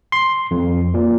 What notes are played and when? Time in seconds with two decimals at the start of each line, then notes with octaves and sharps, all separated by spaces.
0.12 C6
0.51 F2
0.94 A#2